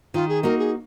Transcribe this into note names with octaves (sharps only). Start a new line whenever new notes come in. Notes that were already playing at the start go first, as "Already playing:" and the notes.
D#3 F4
G#4
A#3 D#4 F#4 A#4
G#4